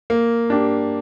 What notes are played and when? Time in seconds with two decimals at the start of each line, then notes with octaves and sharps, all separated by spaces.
0.10 A#3
0.50 D4 G4